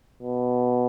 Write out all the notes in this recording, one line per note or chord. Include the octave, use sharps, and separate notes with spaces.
B2